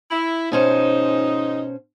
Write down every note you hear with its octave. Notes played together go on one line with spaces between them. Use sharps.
E4
G#2 B2 F3 C#4 D#4 C5